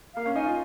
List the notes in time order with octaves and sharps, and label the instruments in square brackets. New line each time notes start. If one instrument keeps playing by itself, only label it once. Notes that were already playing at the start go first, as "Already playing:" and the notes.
[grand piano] A#3 [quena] F5
[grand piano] C#4
[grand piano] D#4 [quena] G#5
[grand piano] F4